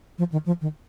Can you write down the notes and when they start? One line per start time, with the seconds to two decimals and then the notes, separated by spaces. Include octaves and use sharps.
0.18 F3
0.32 D#3
0.46 F3
0.61 D#3